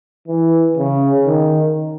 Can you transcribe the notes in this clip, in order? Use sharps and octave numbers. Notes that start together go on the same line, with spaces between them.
E3
C#3
D#3